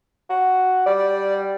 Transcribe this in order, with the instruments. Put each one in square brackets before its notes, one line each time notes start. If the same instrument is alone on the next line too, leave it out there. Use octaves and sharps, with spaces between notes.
[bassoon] F#4
[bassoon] G3 [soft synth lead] D5